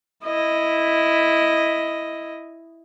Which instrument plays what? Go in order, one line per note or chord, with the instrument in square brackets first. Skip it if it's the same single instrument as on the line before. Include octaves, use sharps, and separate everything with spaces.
[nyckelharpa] E4 D#5